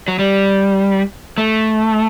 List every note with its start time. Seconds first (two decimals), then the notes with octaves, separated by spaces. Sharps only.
0.08 F#3
0.19 G3
1.38 A3